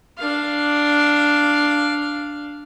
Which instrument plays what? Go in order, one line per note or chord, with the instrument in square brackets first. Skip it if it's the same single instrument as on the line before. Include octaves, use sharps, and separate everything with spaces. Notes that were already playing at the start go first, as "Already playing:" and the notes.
[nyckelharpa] D4 F5